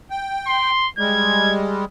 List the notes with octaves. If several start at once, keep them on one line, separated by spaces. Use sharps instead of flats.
G5
C6
G3 G#3 G#6